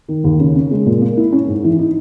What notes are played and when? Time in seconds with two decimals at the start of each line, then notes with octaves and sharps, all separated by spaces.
0.08 D#3
0.24 D#2
0.39 C#3
0.55 C#4
0.71 G#3
0.86 A#2
1.02 A#3
1.17 E4
1.32 C#4
1.48 G#2
1.64 E3
1.79 D#4